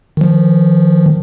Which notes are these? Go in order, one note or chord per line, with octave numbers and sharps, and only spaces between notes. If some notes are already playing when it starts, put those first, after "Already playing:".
D#3 F3